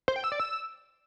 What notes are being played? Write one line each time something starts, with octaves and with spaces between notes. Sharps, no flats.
C5
G5
E6
D5
E6